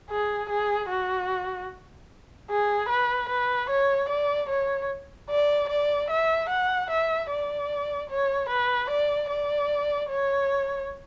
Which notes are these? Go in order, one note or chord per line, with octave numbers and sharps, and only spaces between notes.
G#4
G#4
F#4
G#4
B4
B4
C#5
D5
C#5
D5
D5
E5
F#5
E5
D5
C#5
B4
D5
D5
C#5